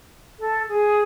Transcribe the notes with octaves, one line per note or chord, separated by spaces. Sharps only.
A4
G#4